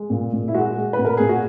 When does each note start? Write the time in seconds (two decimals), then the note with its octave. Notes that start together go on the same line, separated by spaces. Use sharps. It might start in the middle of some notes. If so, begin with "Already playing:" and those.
Already playing: G#3
0.10 A#2
0.33 A#2
0.48 E4
0.54 G#3 F#4
0.76 G#3
0.93 B4
0.99 A#2
1.05 A#4
1.17 A#2 G#4
1.29 F#4